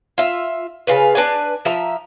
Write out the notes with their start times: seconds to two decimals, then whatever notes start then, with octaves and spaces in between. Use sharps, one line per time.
0.18 F4 E5
0.87 C#3 F4 B4
1.15 D4 B4 D5 G#5
1.65 F3 E5 A#5